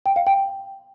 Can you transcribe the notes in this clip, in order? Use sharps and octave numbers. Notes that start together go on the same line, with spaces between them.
G5
F5
G5